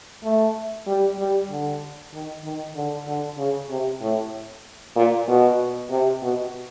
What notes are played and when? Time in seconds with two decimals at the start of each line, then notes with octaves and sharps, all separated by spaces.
0.23 A3
0.87 G3
1.19 G3
1.50 D3
2.13 D#3
2.44 D#3
2.76 D3
3.07 D3
3.38 C#3
3.70 C3
4.01 A2
4.96 A#2
5.28 B2
5.90 C3
6.22 B2